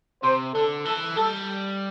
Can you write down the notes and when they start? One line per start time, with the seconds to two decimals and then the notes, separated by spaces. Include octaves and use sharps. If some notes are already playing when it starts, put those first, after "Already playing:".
0.23 C3 C5
0.54 D3 A4
0.85 E3 A4
1.17 G3 A4